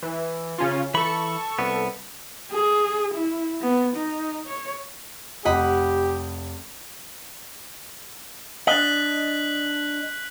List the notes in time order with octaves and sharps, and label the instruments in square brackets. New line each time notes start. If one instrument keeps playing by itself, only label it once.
[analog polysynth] E3
C#3 C#4 F4
[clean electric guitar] E3 B5 [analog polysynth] A4 C#6
[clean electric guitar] C2 B3
[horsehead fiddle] G#4
E4
B3
D#4
C#5
[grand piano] F1 [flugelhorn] G4 [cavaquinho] D#5 F#5 B5
[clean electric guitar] D4 D#5 [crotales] F#6 B6 F#7